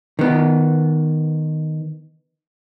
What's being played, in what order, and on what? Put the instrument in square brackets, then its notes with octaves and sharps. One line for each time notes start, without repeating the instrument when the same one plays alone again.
[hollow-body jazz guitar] D#3 B3